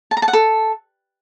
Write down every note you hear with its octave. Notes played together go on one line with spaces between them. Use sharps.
A5
A#5
A5
F#5
A4